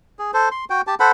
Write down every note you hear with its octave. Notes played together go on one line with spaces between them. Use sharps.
G#4
A4 C5
C6
F#4 G5
G4 A5
A4 C5 F#5 B5